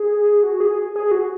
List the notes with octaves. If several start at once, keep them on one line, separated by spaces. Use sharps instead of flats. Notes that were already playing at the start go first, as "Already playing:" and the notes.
Already playing: G#4
F#4
G#4
G#4
F#4